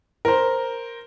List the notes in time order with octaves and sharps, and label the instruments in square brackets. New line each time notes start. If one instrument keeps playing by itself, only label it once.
[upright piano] A#4 C5